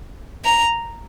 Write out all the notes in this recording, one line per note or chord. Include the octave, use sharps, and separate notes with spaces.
A#5